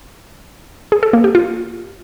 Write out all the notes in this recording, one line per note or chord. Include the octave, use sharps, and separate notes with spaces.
G#4
A4
A#3
G4
F4